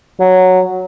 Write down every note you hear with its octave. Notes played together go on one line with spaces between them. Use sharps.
F#3